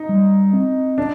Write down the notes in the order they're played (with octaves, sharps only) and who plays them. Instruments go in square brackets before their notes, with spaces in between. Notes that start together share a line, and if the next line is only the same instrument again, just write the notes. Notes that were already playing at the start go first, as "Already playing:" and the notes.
Already playing: [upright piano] D#4
[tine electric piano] G3
C4
[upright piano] D4